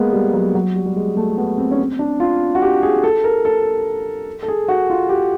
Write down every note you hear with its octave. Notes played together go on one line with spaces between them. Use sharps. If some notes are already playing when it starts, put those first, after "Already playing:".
Already playing: G#3 A#3 B3
G3
F#3
F#3
G3
G3
G#3
A3
B3
C4
C#4
C4
D4
F4
F#4
G4
G#4
A4
A#4
A4
A4
G#4
F#4
F4
G4